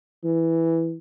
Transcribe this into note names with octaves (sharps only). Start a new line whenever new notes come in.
E3